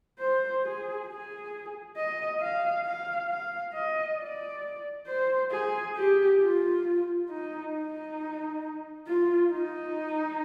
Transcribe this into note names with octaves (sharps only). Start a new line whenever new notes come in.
C5
G#4
G#4
D#5
F5
F5
F5
D#5
D5
C5
G#4
G4
F4
D#4
D#4
F4
D#4